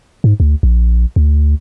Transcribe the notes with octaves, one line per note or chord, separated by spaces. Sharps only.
G#2
D2
A#1
D2